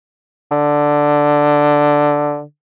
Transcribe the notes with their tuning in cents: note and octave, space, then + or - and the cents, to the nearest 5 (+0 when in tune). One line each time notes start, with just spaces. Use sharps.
D3 +0